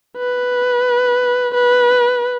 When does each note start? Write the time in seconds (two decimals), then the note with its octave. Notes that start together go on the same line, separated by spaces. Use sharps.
0.17 B4
1.54 B4